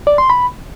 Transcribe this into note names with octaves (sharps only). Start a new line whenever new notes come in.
D5
C6
B5